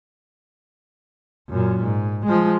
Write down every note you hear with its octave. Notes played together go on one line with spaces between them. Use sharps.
F#2 A#2
G#2
F3 G#3